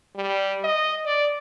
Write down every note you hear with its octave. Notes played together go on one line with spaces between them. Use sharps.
G3
D#5
D5